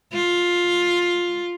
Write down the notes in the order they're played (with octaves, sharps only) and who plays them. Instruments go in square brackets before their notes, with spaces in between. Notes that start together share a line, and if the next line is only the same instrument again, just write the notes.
[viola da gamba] F4